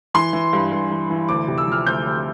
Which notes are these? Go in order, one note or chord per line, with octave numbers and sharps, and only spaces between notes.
E3 C6
E3
G2
G2
E3
E3
D2 D6
C3
E6
F3 F6
D2 G6
D2